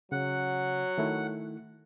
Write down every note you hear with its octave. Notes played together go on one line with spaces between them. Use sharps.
C#3 F#3 F#5
D#3 A3 E4